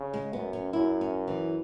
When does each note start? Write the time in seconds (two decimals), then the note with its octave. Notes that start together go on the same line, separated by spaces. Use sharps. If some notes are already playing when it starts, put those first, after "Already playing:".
Already playing: C#3
0.13 G#3
0.33 F#2 B3
0.53 C#4
0.73 F#2 E4
1.01 C#4
1.28 E3